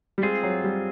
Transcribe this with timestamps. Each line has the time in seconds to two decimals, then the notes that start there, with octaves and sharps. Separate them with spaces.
0.18 G3
0.23 G#3 C4 F4 G#4
0.43 F#3
0.64 G3